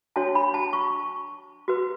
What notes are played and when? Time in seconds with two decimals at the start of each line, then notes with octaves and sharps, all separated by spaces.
0.16 D4 F#4 C#5 A5
0.35 B5
0.54 A5
0.73 C#6
1.68 F#4 B4